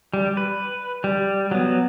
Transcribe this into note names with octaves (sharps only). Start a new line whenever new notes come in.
G3
B4
G3
F#3 B3